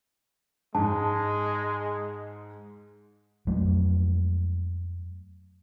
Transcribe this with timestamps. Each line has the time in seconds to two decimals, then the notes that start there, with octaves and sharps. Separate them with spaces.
0.75 G#2 G#3 A5
3.47 F2 F#3 G#3 A3